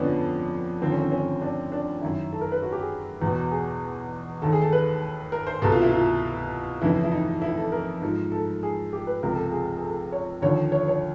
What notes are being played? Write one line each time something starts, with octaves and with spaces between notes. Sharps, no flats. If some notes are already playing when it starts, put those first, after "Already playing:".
Already playing: F2 D3 F3 B3 C#4 D4
D#2 D3 F3 C4
C#4
C4
C#4
D4
D4
F#2 D#3 E4
A4
A#4
B4
F#4
G4
G#4
E2 B2
G#4
D#2 D#3 A4
G#4
A4
B4
A#4
C5
C2 B2 A4
F4
E4
F4
F2 C#3 E3 E4
E4
D#4
E4
A4
A#4
G#2 F3
A4
G#4
G4
B4
C#2 C3 F3 A#4
A4
G#4
G#4
A4
C#5
D#2 D3 F3 C#5
C#5
C#5